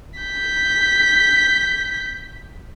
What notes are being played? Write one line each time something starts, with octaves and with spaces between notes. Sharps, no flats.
G6 B6